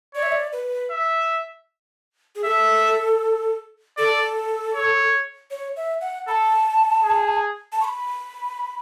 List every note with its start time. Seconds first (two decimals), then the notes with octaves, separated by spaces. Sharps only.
0.15 C#5 D5
0.23 E5
0.32 D5
0.53 B4
0.91 E5
2.35 G#4
2.44 A4 E5
3.98 A4 D5
4.75 C#5
5.51 C#5
5.76 E5
6.01 F#5
6.27 A4 B5
6.31 A5
7.03 G#4
7.72 A5
7.81 C#6
7.84 B5